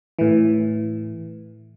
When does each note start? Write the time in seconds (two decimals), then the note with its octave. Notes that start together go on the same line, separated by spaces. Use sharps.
0.19 A2 E3